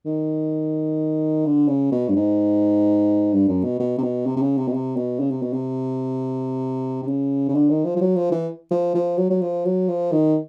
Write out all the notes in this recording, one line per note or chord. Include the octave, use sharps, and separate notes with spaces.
D#3
D3
C#3
B2
G2
G#2
G2
F#2
B2
B2
C3
B2
C3
C3
C#3
C3
B2
C3
B2
C#3
C3
B2
C3
C3
C#3
C#3
D3
D#3
F3
F3
F#3
F3
E3
F3
F3
F#3
F#3
F3
F#3
F3
D#3